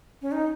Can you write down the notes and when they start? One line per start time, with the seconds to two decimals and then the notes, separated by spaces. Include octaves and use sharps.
0.22 C#4
0.32 D#4